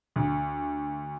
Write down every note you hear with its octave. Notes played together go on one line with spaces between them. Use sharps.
D2